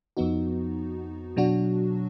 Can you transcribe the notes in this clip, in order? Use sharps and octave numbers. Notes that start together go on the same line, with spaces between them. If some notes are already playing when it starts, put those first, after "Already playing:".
F2 F3 B3 D#4 F#4
B2 F#3 D4 F#4